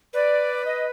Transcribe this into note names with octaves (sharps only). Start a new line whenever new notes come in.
B4 D5
D#5